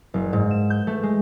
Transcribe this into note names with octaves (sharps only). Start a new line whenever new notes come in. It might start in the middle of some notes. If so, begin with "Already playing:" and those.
F#1
G#2
E7
G6
A3
G#3